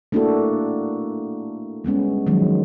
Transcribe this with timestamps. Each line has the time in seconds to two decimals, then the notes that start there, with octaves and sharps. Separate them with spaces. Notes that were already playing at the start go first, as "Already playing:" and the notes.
0.12 A3 A#3 D4 E4 F#4 A4
1.84 G3 G#3 B3 C#4
2.26 D#3 F3 F#3 G#3